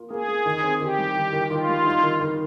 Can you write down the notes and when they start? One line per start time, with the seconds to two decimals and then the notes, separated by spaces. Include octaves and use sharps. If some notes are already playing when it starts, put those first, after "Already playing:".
Already playing: A#3 F4
0.10 A#3 G#4
0.28 A#3
0.46 D#3
0.63 C4
0.80 D#3 G4
0.98 G3
1.16 D#3
1.33 D#3
1.51 D#3 F4
1.68 G3
1.86 D#4
2.03 D#3
2.21 D#3